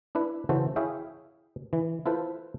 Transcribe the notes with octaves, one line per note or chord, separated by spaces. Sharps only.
D4 E4 B4
C#3 E3 F#4 A4 C5
E4 G#4 C#5 E5 F5 G5
E3
E4 F4 A4 B4 C5